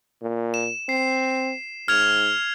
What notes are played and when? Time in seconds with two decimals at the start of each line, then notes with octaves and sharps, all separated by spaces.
0.22 A#2
0.54 E7
0.89 C4 C7
1.88 G#2 F6 G#6 F7